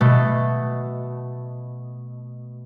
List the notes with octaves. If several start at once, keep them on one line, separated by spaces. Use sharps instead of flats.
B2 A3